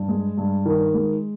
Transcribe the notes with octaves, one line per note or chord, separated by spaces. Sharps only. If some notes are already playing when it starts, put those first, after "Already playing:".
Already playing: G2
G#3
G2
D#3
G#3